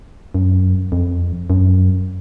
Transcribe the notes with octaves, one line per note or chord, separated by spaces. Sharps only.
F#2
F2
F#2